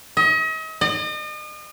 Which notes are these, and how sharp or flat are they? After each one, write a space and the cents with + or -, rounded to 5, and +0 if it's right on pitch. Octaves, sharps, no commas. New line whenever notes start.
D#5 +40
D#5 -40